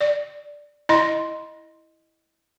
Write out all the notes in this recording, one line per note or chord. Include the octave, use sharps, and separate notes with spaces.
D5
E4 D#5 C6